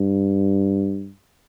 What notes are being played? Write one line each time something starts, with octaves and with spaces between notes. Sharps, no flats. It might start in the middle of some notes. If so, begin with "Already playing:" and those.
Already playing: G2